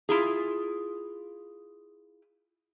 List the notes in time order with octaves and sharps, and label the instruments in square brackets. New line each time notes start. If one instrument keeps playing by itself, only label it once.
[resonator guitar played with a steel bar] E4 F4 G#4